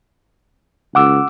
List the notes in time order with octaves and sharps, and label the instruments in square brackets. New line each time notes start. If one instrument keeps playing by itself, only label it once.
[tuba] C#2 [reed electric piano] F#5 D6 E6